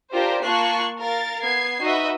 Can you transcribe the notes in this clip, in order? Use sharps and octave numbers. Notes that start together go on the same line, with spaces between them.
D4 F4 G4 A#4 C5
A#3 F4 A5 C#6 F#6 C7
A#4 F5 A6
B3 G#6 C7
D#4 F#4 B4 D#5 E5